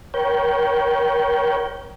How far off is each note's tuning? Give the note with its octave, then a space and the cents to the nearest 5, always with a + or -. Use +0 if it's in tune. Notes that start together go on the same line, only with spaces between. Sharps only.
A#4 +35 C#5 +0 G5 -20